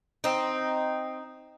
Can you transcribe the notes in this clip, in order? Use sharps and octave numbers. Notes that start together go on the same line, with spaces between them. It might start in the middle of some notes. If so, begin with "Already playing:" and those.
C4 D#4